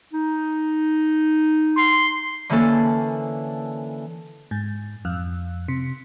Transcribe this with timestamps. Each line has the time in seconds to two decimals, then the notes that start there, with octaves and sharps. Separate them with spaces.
0.13 D#4
1.77 C6
2.49 D3 E3 A#3 C#4 A4
4.51 G#2
5.05 F2
5.68 C3